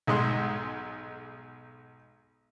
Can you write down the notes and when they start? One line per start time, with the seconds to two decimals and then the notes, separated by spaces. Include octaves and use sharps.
0.07 B1 G#2 G#3 C6